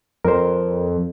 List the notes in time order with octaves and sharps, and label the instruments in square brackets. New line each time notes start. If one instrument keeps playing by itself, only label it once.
[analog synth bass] F2 [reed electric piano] A#4 C5